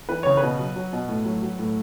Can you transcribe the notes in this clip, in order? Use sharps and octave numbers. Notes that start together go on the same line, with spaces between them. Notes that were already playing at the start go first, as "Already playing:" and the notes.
E3 B4
C#3 C#5
B4
B2
F#3
F#3
B2
A2
F#3
F#3
A2